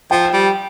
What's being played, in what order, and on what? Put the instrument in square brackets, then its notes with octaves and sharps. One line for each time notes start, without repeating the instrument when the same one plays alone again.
[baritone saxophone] F3 [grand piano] G5
[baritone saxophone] G3